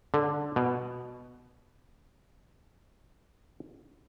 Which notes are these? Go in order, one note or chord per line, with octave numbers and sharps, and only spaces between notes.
D3
B2